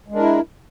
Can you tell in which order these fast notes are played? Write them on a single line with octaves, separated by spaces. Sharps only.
G#3 D4 A#4 E4